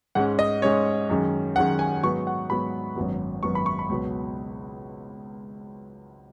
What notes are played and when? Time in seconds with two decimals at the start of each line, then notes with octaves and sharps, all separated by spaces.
0.15 G#2 G#3 C#4 F#5
0.39 D#5
0.62 G#2 G#3 C#4 C#5
1.10 F#2 D#3 G#3 C#4
1.56 F#2 D#3 G#3 C#4 F#5
1.79 G#5
2.03 G#2 F#3 B3 C#6
2.27 F#5
2.50 G#2 F#3 B3 B5
2.96 G#1 F#2 F#3 B3
3.43 G#1 F#2 F#3 B3 C#6
3.55 B5
3.66 C#6
3.79 B5
3.89 C#2 B2 F#3 B3